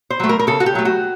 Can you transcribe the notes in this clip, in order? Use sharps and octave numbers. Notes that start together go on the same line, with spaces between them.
C5
F#3 A3
A#4
A#4
C#3 A4
F#4
G4
F#3 A3
F#4